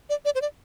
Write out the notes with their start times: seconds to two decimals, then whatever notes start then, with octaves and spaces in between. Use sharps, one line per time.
0.10 D5
0.25 D5
0.35 C5
0.42 D5